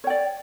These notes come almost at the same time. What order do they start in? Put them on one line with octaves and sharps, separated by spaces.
C#5 G5 D5